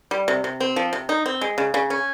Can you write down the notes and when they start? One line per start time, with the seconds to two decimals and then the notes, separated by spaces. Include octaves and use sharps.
0.11 G3
0.28 C3
0.44 C3
0.60 C4
0.76 F3
0.93 C3
1.09 D#4
1.26 C4
1.41 G#3
1.58 C#3
1.74 C#3
1.90 C#4